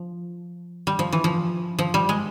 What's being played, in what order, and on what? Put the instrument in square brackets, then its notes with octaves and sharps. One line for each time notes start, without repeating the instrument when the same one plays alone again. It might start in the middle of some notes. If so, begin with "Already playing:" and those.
Already playing: [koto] F3
G3
F3
E3
F3
F3
G3
G#3